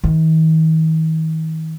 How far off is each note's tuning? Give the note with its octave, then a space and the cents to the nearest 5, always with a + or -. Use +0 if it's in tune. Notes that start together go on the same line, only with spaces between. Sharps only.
D#3 +45